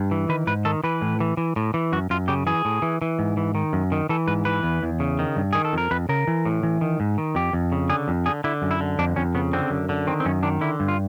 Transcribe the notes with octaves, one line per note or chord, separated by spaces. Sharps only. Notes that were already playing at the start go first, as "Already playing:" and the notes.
Already playing: G2
E3
D#3 B4
G#2 B4
D#3 A4
E3 B4
A2
E3
E3
A2
E3
F#2 F#4
F#2 F4
C#3 G4
E3 G#4
A2
E3
E3
G#2
E3
D#3
F#2
D#3
E3 A4
G#2 B4
E3 B4
E2
E2
C#3
D#3
G2
D#3 G#4
A4
F2 A#4
F2 B4
C#3 A#4
E3
A2
E3
D#3
G#2
D#3
F2 G4
F2
C#3
D3 G#4
F2
D3 G#4
D3 E4
F#2
E4
D3
F2 D4
F2 C#4
C#3 B3
D3 C4
F#2
D3
D#3 C4
C4
F#2 C#4
D#3 D4
D3 E4
G2
F4